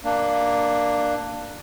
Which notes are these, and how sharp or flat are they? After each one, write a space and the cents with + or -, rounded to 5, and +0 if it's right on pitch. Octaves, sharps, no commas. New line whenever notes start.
A#3 +0 D4 +15